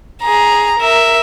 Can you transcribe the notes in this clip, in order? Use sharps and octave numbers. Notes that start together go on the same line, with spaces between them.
G#4 A#5
A#4 E5